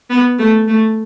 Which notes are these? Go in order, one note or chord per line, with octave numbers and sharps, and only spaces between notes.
B3
A3
A3